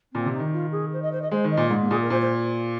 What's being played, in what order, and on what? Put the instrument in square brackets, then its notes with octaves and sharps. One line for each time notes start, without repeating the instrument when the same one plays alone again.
[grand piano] A#2 [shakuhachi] C4
[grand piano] C3
[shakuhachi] D#4
[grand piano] D#3
[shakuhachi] F4
G#4
C5
D#5
C5
D#5
[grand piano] G#3 [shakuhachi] C5
[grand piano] D#3
[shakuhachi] D#5
[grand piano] A#2
G#2
[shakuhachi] A#3
[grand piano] A#2 [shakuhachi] G#4
[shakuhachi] A#4
[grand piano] A#2 [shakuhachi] C5
[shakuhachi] C5